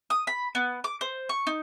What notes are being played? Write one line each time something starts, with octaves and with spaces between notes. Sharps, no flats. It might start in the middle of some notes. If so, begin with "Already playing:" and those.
D#6
B5
B3
D6
C5
C#6
D#4